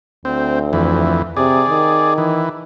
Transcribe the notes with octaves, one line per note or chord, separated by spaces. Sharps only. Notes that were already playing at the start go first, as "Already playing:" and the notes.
D2 C4
F2 E3
C3 G#4 D5
D#3
E3